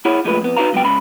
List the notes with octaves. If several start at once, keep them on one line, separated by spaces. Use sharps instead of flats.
E4 G#4 C#5 F#5 B5
A#2 F3 G#3 A3 B4
F2 B3
D#4 F#4 B4 F5 A#5
C#2 F#3 B3 G5
G#2 C#3 B5